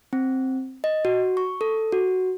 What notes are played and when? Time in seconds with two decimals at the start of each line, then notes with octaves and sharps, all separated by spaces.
0.13 C4
0.84 D#5
1.05 F#4
1.37 C#6
1.61 A4
1.92 F#4